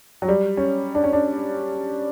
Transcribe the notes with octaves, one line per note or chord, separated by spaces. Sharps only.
F#3
G3
C#4
D4
C#4
D4